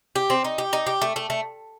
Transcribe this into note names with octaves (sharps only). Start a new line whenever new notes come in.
G4
C4
D#4
G4
D#4
G4
A3
A3
A3